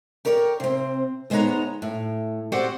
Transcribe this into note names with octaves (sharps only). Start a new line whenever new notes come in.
G4 A#4 C#5 D5
C3 C4
D2 G#3 B3 D#4 C#5 A#5
A2
C4 F#4 G4 C5 D5 F#5